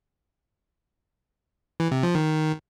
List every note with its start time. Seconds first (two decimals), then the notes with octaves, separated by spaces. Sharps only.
1.80 E3
1.91 C3
2.03 F3
2.15 D#3